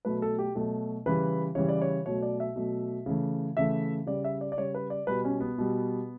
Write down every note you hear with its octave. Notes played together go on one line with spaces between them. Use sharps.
B2 F#3 A3 B4
A4
G4
B2 F#3 A3 A4
C#3 E3 G3 B4
C#3 E3 G3 C#5
D5
C#5
B2 F#3 A3 C#5
D5
E5
B2 F#3 A3
C#3 E3 A3
C#3 E3 A3 E5
C#3 G3 D5
E5
D5
D5
C#3 G3 C#5
B4
D5
B2 G3 B4
C#4
B3
B2 G3